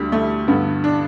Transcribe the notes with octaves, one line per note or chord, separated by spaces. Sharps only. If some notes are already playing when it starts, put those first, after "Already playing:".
Already playing: D2 D3 G3
A3
G2 D3 B3
D4